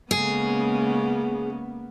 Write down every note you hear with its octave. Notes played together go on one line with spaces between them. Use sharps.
C#3 G#3 A#3 B3 C#4 G#4